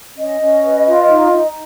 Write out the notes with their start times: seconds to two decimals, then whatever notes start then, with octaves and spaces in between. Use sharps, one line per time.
0.17 C#4 D#5
0.41 C#4
0.63 B4
0.87 F4
1.09 D#4
1.32 D#4